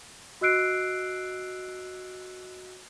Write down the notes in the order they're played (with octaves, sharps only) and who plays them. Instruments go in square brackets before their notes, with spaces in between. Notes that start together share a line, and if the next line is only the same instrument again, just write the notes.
[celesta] F#4 D#5 E6 F#6 C7 D7